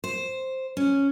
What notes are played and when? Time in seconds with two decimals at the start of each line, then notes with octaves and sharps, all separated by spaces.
0.04 C5
0.77 C#4